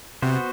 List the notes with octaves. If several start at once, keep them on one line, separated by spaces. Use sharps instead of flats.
C3 B3 F#4 C5